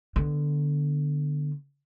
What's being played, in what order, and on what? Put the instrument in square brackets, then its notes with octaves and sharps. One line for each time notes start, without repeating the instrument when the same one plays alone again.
[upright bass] D3 B3